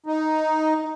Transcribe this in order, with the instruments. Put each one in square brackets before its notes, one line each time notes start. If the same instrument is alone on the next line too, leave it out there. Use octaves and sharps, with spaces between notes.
[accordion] D#4